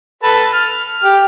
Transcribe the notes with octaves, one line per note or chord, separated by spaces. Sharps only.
A4 B4 A5
F6
G4